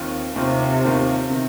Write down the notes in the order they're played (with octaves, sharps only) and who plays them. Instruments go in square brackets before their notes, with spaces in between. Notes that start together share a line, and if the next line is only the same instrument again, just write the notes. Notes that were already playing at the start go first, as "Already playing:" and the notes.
Already playing: [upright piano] D#2 D#3 C4 F4
[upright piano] D#2 D#3 C4 F4 [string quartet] C3
[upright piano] D#2 D#3 C4 F4
C3 D#3